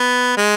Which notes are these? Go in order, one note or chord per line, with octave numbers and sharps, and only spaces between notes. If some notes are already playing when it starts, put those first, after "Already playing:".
Already playing: B3
G#3